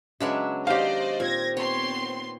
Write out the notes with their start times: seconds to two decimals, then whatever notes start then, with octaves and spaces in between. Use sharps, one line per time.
0.20 C#3 F#3 G#3 B3 D4 E5
0.67 D#3 D#4 G4 C5 D5 D#5 F5
1.20 A#2 C4 G#6 A#6
1.57 B3 C4 C#5 C6